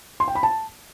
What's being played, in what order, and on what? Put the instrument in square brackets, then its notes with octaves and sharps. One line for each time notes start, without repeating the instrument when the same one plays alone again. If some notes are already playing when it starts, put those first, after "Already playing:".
[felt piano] C6
G5
B5
A5